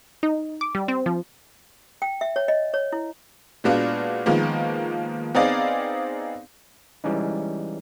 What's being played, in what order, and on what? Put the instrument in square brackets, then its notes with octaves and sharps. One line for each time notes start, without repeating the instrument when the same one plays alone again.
[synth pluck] D#4
D6
G3
C4
F3
[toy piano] G5
E5
C#5
D#5
C#5
E4
[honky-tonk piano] A#2 G#3 B3 D4 F4 F#4
D#3 F3 G#3 A#3 B3
B3 C4 D#4 G#4 D5 F5
[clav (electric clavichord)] E3 G3 G#3 C#4 D#4